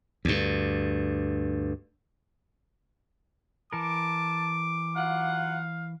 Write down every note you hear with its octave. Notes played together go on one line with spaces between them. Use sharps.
D2 G2
E3 A#4 A5 D6
F#3 F4 F5 F#5